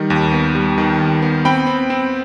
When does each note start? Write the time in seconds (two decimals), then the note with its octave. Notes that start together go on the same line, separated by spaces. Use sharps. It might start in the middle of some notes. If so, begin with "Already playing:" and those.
Already playing: D#3 G3
0.10 D#2
0.33 B3
0.55 G3
0.78 D#3
1.00 D#2
1.22 B3
1.45 C4 G5 B5
1.67 C4
1.90 C4